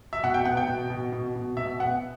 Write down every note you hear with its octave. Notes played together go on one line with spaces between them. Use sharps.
E5
B2 F#5
G5
B3 F#5
G5
B2
B2
B2
B2
B2 E5
B3 F#5